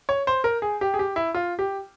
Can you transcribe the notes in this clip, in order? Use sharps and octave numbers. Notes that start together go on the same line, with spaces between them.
C#5
C5
A#4
G#4
G4
G#4
G4
E4
F4
G4